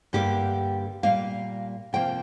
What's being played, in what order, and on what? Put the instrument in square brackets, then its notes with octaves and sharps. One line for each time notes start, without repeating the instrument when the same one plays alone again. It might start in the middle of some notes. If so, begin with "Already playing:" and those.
[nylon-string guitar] G2 D3 G3 A#3 G4
A#2 G3 A#3 F5
C3 F3 A#3 G5